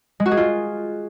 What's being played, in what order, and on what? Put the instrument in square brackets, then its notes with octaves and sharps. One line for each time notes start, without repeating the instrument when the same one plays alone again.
[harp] G#3
F#4
G#4
F4